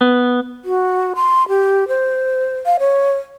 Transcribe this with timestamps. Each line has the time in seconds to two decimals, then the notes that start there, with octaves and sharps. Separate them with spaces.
0.01 B3
0.65 F#4
1.16 C6
1.49 G4
1.88 C5
2.66 F5
2.80 C#5